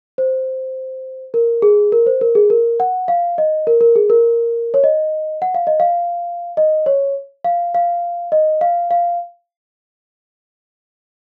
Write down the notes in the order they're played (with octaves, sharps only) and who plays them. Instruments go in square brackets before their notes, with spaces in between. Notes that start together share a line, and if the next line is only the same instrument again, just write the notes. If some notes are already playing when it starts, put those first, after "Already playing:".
[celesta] C5
A#4
G#4
A#4
C5
A#4
G#4
A#4
F#5
F5
D#5
A#4
A#4
G#4
A#4
C#5
D#5
F#5
F5
D#5
F5
D#5
C#5
F5
F5
D#5
F5
F5